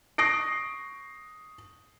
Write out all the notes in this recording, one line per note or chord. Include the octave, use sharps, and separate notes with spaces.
C#6 D#6 A#6 C7 D7